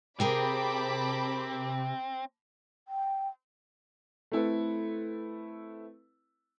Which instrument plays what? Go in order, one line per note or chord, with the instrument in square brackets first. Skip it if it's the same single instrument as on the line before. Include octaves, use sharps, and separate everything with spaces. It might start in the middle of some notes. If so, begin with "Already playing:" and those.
[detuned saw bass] C3 [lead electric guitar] C4 [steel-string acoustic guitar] G#4 A#4 G5 [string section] A5 B5 D6
[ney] G5
[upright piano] A3 C4 E4 A4 B4